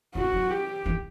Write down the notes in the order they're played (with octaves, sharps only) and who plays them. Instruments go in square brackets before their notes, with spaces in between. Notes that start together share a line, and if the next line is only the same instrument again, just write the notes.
[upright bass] A3 [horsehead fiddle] F#4
[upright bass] F#3
[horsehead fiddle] G4
[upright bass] E3